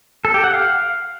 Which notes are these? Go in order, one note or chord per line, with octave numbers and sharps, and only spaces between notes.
A4
G4
F#5
F5